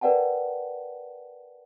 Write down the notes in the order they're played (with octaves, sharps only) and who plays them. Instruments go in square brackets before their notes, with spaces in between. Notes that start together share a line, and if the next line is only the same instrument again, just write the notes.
[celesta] A#4 B4 D5 F#5 G5 A5